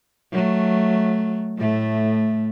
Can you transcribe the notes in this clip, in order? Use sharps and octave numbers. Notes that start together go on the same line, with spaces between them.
F#3 A3
A2 A3